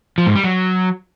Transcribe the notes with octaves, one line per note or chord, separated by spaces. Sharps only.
F3
G#2
G3
F#3